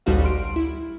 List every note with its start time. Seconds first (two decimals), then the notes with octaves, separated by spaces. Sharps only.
0.06 A1 D2 G3 D#4 F#4 F5
0.24 C6 F6 D7
0.56 E4